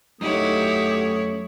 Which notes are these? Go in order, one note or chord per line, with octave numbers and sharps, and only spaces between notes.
F#2 A3 D#4 E4 G4 C#5 F#5 D#6